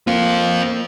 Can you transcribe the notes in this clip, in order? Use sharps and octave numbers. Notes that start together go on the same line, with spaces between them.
A#3 C4 F4